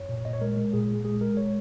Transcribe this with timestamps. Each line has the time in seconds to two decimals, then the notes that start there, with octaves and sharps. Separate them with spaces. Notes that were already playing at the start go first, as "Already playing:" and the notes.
Already playing: F#2 C#5
0.09 A#2
0.25 A#2 D#5
0.33 C#5
0.41 G#3 A#4
0.57 G#3
0.73 A#2 G#4
0.90 A#2
1.05 G#3 G#4
1.21 G#3 A#4
1.37 C#5